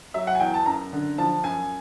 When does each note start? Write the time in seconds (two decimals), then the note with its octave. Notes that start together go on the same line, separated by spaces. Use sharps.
0.14 F#3 E5
0.27 F#5
0.35 G#5
0.40 E2 G5
0.54 A5
0.66 F#2 A#5
0.93 D3
1.18 F3 A5
1.44 F#2 G#5